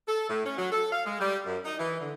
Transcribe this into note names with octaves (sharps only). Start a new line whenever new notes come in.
A4
A2
C#4
F#3
A4
F5
G#3
G3
F#2
D#4
E3
D3